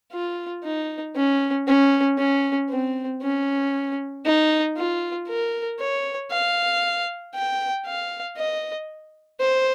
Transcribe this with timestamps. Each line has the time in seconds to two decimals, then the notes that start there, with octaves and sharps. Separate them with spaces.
0.13 F4
0.64 D#4
1.16 C#4
1.67 C#4
2.18 C#4
2.70 C4
3.22 C#4
4.25 D#4
4.77 F4
5.28 A#4
5.80 C#5
6.31 F5
7.35 G5
7.86 F5
8.37 D#5
9.41 C5